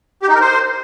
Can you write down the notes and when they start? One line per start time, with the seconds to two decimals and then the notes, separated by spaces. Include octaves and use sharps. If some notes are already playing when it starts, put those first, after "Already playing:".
0.22 G4
0.29 D#4
0.35 A#4
0.41 C5